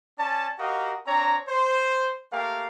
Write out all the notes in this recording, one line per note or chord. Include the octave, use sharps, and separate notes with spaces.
C#4 D5 A5
F#4 G4 A#4 D#5 F5
C4 D4 C#5 A#5
C5
A3 A#3 G4 A#4 F5